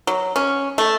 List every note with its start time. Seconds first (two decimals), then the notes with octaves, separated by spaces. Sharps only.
0.07 F#3
0.36 C#4
0.78 A3